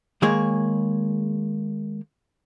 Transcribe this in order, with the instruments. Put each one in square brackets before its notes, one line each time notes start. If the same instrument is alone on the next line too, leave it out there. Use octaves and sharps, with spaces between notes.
[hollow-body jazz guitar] D#3 G#3 A#3 G#4 C#5